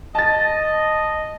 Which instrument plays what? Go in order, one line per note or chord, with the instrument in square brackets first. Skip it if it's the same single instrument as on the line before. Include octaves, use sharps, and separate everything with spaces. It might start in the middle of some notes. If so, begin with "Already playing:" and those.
[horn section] D#5 [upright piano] A5 A6